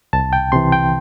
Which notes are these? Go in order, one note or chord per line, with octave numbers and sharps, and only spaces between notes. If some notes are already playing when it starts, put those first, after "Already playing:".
C2 A5
G5
C3 E3 C6
G5